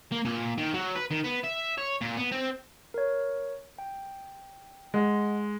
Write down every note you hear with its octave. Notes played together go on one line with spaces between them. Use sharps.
A#3
A#2
D#3
F#3
B4
D#3
B3
E5
C#5
A#2
B3
C4
A#4 C#5
G5
G#3 D#5 F#5